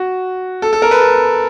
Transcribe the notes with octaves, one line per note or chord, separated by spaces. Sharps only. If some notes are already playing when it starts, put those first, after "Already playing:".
Already playing: F#4
A4
A4
A#4
B4
A4